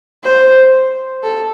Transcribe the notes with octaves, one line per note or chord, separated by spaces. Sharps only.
C5
A4